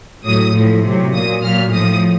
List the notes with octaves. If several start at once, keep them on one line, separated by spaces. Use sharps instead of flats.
A2 F#3 D#6
A2 F3
C3 F#3
A#2 F#3 D#6
A#2 F#3 F6
A2 F3 D#6